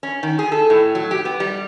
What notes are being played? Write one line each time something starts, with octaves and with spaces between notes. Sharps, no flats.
C#4
D#3
G#4
A4
A2
F#3
G4
B3
G3